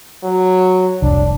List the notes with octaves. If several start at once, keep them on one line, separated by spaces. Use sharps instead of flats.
F#3
F1 C2 D4